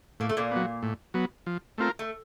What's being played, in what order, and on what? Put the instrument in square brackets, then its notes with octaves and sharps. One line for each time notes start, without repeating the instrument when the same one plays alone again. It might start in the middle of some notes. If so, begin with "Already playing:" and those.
[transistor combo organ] A2 [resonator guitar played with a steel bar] A#3
[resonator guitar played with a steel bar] A3
A#2 A#3
[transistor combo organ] F#3 B3
A2
F#3 B3
F3
A3 C4 F4 A#4
[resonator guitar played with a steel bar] A3